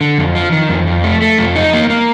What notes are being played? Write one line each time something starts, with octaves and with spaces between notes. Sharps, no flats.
D3
F2
F3
D#3
F2
F2
A3
A3
F2
D#4
A#3
A#3